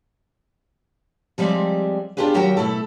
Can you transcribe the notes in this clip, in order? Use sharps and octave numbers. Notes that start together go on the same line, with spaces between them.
F3 G3 G#3 C4 D5 E5
B3 D4 F4 G4 G#4 B4
D#2 F#3 F#4 G4 A#4 G5
B2 A3 E4 A4